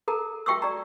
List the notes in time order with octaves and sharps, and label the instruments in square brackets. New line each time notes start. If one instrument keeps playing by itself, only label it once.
[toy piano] A4 A#4 A#5
F#4 E5 G5 C#6 D6 E6
D5 A#5